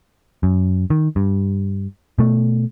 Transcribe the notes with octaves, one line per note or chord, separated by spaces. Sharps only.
F#2
D#3
G2
B2 A3